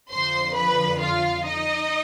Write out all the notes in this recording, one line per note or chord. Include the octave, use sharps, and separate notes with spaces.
F2 D3 F3 C5 C6
B4 B5
F4 F5
D#4 D#5